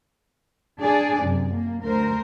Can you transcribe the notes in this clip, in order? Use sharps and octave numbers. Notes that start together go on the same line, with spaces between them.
D4 G#4 D5
F#2 C3
A#3
D2 A#4 C5